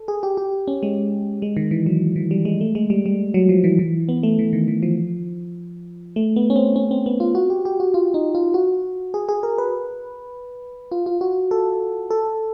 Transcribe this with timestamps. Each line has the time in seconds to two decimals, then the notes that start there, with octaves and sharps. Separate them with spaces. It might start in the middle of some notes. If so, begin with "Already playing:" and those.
Already playing: A4
0.08 G#4
0.23 G4
0.37 G4
0.68 C#4
0.83 G#3
1.42 G#3
1.57 D#3
1.71 E3
1.86 F#3
2.16 E3
2.31 G3
2.45 G#3
2.61 A3
2.75 G#3
2.90 G3
3.06 G3
3.34 F#3
3.49 F3
3.64 E3
3.79 E3
4.09 B3
4.23 A3
4.39 E3
4.53 D#3
4.68 E3
4.83 F3
6.16 A3
6.36 B3
6.50 C#4
6.56 C4
6.76 C#4
6.91 C4
7.06 B3
7.20 F4
7.35 F#4
7.50 G4
7.65 G4
7.80 F#4
7.94 F4
8.14 D#4
8.35 F4
8.54 F#4
9.14 G#4
9.29 G#4
9.43 A#4
9.58 B4
10.92 F4
11.06 F4
11.21 F#4
11.51 A4
12.11 A4